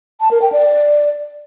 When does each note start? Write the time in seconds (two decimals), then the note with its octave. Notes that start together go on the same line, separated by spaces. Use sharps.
0.20 A5
0.31 A#4
0.42 G5
0.52 D5